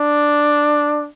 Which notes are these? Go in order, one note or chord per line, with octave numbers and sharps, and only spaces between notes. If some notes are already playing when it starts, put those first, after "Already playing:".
Already playing: D4